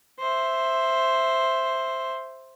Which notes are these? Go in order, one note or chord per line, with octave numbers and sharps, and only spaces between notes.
C5 E5